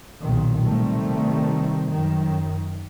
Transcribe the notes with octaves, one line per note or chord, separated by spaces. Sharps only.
B1 A#2 D#3
C3 D#3 G3 A3
F#2 D#3